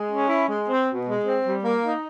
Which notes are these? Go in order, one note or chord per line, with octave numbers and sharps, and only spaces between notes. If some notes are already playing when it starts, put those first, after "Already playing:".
Already playing: G#3
C#4
E4
G#3
C4
B2
G#3
C4
G3
A#3
D#4